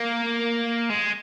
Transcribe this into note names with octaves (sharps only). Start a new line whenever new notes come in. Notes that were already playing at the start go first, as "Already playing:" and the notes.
Already playing: A#3
G#3